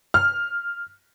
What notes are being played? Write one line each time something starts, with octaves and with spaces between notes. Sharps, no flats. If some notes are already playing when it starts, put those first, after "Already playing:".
F6